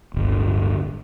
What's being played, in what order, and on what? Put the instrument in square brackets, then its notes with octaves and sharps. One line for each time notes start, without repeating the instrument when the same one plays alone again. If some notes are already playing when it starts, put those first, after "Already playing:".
[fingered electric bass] D1 G1